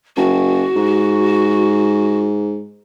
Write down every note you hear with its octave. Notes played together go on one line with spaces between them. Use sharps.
F#1 F#4
G#2